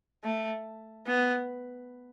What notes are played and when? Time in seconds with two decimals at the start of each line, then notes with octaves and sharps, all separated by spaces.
0.24 A3
1.07 B3